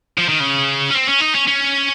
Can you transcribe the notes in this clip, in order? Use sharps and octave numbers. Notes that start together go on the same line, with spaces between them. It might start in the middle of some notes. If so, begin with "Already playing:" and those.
F3
D#3
C#3
C#4
C4
C#4
D#4
C#4
C#4